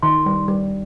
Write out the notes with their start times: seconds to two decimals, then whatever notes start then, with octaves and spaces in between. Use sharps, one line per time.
0.03 D#3 C6
0.26 G3
0.48 G3